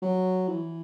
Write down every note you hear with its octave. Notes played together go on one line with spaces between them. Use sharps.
F#3
E3